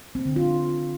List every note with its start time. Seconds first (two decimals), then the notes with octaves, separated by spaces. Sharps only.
0.15 C4
0.26 D3
0.36 F4